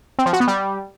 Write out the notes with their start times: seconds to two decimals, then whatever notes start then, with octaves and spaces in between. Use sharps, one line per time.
0.19 C4
0.26 F3
0.33 F#4
0.40 B3
0.48 G3